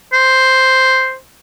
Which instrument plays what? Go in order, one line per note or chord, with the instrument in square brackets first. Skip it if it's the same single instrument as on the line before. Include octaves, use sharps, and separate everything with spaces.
[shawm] C5